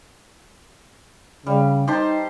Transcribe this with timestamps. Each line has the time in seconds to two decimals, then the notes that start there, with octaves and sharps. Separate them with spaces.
1.47 C#3 G3
1.88 D#4 G4 C5 A5